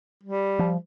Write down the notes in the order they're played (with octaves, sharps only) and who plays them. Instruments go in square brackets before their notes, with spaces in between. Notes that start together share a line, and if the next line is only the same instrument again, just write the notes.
[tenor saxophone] G3
[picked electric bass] F3